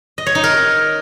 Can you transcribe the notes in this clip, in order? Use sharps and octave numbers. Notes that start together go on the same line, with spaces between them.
D#5
C#5
D#4
A#4